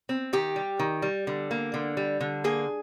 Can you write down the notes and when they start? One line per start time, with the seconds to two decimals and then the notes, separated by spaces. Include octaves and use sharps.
0.09 C4
0.33 D#3 G4
0.56 G3
0.79 D#3
1.02 G3
1.27 D3
1.51 A#3
1.74 D3
1.97 G3
2.21 D3
2.44 A#3 G#4